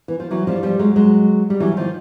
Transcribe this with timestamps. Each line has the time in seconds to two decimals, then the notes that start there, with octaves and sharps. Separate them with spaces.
0.08 E3
0.20 F3
0.31 E3 F#3
0.47 F3 G3
0.63 F3 G3
0.79 F#3 G#3
0.96 F#3 G#3
1.50 G3
1.60 E3 F#3
1.77 D#3 F3